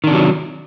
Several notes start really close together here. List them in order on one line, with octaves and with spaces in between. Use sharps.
D#3 D4 C3 F#3